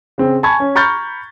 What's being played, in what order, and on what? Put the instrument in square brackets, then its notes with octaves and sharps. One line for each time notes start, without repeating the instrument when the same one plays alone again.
[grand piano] C#3 C4
G#5 A5 B5 C#6 G#6
C#4
A#5 B5 C#6 F6 G6 A6